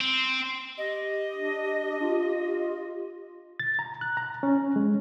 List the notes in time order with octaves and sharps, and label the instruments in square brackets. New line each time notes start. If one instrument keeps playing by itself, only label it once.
[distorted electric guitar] C4
[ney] G4 [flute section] D#5
[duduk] D4
F4
[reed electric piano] A6
A#5
F#6
A#5
C#4
G#3